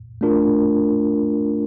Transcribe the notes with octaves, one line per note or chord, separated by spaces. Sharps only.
A3 D4 F4 A#4